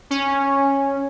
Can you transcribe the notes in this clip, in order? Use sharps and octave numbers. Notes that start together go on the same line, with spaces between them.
C#4